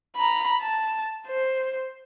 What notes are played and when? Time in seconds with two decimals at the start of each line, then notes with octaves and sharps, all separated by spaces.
0.17 A#5 B5
0.62 A5
1.27 C5